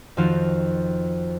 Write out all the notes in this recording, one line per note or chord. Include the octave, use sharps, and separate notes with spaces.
F2 D#3 F3 F4 F#4 F5